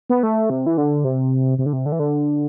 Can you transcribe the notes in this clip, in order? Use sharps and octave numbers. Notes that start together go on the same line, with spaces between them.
B3
A3
C3
E3
D3
C3
C3
D3
C3
D3
E3
D3